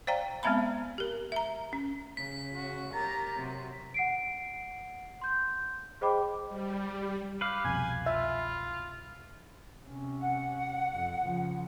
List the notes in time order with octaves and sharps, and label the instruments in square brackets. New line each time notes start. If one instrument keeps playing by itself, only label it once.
[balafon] C5 D5 F5 G5 A#5
G#3 B3 C4 E5 A#5 B5
G4 A#4
E5 A#5
C#4
[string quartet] C#3 [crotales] B6
[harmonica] F#4
[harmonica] G4 A#4 [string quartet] A#5 A6
[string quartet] C3 F#3
[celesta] F#5 C7 D7
C6 G6
G#4 C5 D#5 G5 B5 D6
[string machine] G3
[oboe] G4 [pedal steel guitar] B4 F5
[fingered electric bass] C2 F2 B2 [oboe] G#5
[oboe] F4 [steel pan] E5
[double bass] C3 C#4
[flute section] F#5
[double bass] F2
C#3 F3